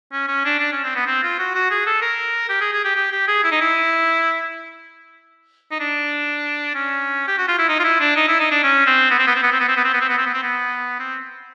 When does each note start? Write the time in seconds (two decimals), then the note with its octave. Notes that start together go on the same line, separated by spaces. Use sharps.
0.12 C#4
0.28 C#4
0.45 D4
0.60 D4
0.72 C#4
0.84 C4
0.95 B3
1.07 C4
1.23 F4
1.39 F#4
1.54 F#4
1.70 G#4
1.86 A4
2.02 A#4
2.49 G4
2.61 G#4
2.72 G#4
2.84 G4
2.96 G4
3.12 G4
3.28 G#4
3.44 E4
3.51 D#4
3.61 E4
5.71 D#4
5.80 D4
6.75 C#4
7.27 G4
7.38 F#4
7.48 F4
7.58 E4
7.68 D#4
7.79 F4
7.84 E4
8.00 D4
8.16 D#4
8.28 E4
8.40 D#4
8.51 D4
8.63 C#4
8.86 C4
9.10 B3
9.18 C4
9.27 B3
9.35 C4
9.43 B3
9.52 C4
9.60 B3
9.68 C4
9.77 B3
9.84 C4
9.93 B3
10.00 C4
10.09 B3
10.17 C4
10.26 B3
10.34 C4
10.43 B3
10.99 C4